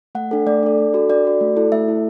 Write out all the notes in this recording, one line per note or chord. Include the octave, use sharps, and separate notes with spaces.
A3 F#5
D4 A4
A3 D5
D4 A4
D4
F#4 A4
D4 D5
F#4 A4
A3
E4 A4
A3 E5
E4 A4